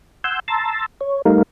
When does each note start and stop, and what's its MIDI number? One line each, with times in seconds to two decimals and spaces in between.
0.24 0.40 78
0.24 0.40 80
0.24 0.40 84
0.24 0.40 88
0.24 0.40 91
0.48 0.86 81
0.48 0.86 82
0.48 0.86 84
0.48 0.86 88
0.48 0.86 93
1.01 1.22 73
1.25 1.43 55
1.25 1.43 57
1.25 1.43 63
1.25 1.43 70
1.25 1.43 77